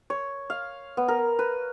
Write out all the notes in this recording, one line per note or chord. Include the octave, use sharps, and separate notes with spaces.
C#5
F5
B3
A#4
B4